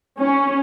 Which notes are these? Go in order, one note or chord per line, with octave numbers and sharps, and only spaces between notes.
C#4